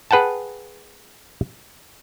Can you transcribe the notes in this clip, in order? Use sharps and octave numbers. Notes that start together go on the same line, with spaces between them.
G#4 B4 F#5 G5 A5